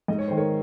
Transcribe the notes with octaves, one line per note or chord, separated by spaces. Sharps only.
G#2 D#5
C#5
D#3 C5
A#4 C#5